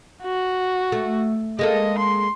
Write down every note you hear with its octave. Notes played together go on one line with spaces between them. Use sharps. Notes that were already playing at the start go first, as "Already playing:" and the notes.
F#4
A3
G#3 A#3 A4 D#5
C6